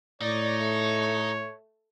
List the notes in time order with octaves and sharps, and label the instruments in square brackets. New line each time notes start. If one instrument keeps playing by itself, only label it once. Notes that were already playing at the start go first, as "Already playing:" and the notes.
[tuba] A2 [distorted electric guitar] D#4 [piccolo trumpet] C#5 [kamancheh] D5
[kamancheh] A3